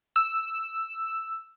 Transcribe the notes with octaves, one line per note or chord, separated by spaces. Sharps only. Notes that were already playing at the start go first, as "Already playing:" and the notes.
E6